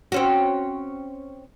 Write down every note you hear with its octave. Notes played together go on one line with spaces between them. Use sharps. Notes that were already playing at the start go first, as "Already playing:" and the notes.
C4 C#4 F#4